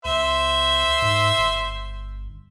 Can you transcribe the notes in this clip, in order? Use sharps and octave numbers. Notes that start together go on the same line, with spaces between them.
C#2 C5 E5
G#2
G1